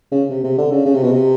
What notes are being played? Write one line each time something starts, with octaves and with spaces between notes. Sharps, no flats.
C#3
C3
C3
D3
C#3
C#3
C3
B2
C3